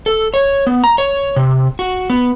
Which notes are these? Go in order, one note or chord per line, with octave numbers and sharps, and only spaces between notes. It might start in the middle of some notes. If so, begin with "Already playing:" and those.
A4
C#5
B3
A#5
C#5
C3
F#4
B3